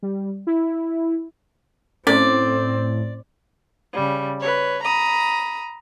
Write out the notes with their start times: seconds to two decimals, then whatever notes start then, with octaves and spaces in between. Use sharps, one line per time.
0.02 G3
0.47 E4
2.07 A2 C4 C#4 A4 D5
3.92 C#3 G3
4.41 B4 C#5
4.83 A#5 B5 D#6